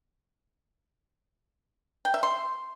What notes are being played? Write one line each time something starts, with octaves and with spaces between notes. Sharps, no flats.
G5
E5
C6